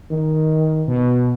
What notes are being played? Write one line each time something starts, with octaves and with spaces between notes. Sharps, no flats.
D#3
B2